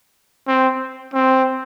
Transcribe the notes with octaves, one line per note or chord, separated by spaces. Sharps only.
C4
C4